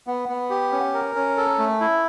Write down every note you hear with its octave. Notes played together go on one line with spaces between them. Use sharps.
B3
B3
G4
C#4
A#4
C#4
A4
A3
E4